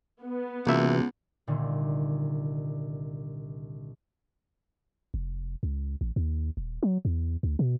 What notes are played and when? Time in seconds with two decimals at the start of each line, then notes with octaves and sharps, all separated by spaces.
0.22 B3
0.67 C#2 C3 E3 A#3 F#4 E5
1.47 C2 A#2 D3 D#3
5.14 F1
5.63 C#2
6.01 A1
6.16 D#2
6.57 D#1
6.83 F#3
7.05 E2
7.43 D2
7.59 B2